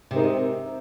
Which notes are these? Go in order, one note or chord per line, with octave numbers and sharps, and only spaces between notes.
C3 G#3 C4 D#4 A#4